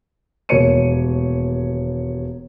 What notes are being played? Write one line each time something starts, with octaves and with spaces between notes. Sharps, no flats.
E1 D#2 A#4 C#5 C#7 D#7